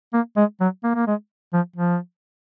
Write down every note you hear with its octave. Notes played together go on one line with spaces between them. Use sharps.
A#3
G#3
F#3
A#3
A#3
G#3
F3
F3